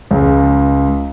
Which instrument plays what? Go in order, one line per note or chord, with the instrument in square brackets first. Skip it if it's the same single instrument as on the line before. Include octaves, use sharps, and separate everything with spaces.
[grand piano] C#2